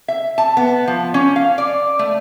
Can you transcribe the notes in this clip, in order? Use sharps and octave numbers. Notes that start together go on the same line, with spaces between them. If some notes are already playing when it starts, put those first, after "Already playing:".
E5
A5
B3
F3
C#4
F5
D5
A3